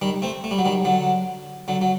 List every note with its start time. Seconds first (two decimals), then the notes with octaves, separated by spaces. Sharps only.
0.02 D#3 G3
0.22 A3 C4
0.44 A3
0.51 G3
0.58 F#3
0.65 D#3 G3
0.85 D3 F#3
1.68 D3 F#3
1.81 F#3